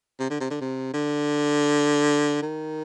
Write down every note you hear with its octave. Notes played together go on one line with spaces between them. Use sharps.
C3
D3
C3
D3
C3
D3
D#3